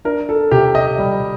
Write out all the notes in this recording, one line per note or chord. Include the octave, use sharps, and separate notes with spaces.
D4 A#4
A4
C3 G4
D#5
G3